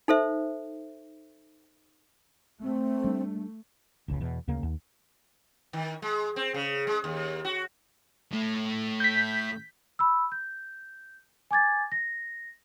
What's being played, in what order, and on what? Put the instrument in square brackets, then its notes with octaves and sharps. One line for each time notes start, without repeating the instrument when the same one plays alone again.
[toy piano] D#4 A4 C5 E5
[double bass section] A3 [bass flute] C4
[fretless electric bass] G3 D4
F1 C#2 C#3
E2 B2
D2 C#3 A#3
D#2
[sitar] D#3
G#3
C4
C#3
G#3
D#2
F#4
[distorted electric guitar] A2 A3
[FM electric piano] G6 B6
[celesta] B5 E6
G6
G#5 D6 G#6 A6
A#6